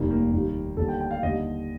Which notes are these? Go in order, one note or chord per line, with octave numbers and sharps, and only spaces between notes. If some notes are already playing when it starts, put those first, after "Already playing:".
Already playing: F1 D#2 D#3 G3 A#3
A#3
D#2 D#3 G3
D#2 D3 G3 A4
G5
G5
F5
D#2 D3 G3 D#5